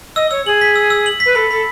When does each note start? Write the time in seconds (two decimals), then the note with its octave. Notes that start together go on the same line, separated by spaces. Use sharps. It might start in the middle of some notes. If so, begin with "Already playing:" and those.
0.16 D#5 E6
0.31 C#5 E6
0.46 G#4 F#7
0.61 B6
0.76 E6
0.90 E6
1.06 F#7
1.20 B6
1.26 B4
1.35 A4 B5
1.51 A4 B5